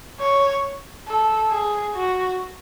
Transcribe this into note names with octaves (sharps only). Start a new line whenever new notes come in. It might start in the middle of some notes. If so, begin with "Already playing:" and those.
C#5
A4
G#4
F#4